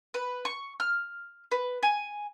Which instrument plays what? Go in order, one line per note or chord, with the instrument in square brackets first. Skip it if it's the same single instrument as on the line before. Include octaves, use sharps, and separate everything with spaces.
[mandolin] B4
C#6
F6
B4
G#5